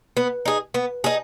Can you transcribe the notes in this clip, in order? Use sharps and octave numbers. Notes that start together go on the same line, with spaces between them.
B3
D#4 G#4
B3
D#4 G#4